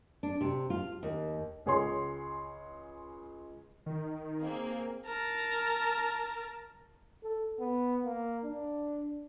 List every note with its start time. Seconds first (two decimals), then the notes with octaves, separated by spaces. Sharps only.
0.23 D4
0.41 C3
0.70 F4
1.03 D#2
1.66 C#2 G#4 C#5 C6
3.86 D#3
4.42 A#3 C4 G#4
5.07 A#4 A5
7.23 A4
7.60 B3
8.04 A#3
8.44 D4